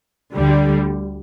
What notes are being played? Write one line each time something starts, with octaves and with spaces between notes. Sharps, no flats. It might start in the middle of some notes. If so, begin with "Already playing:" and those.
D2 D3 G3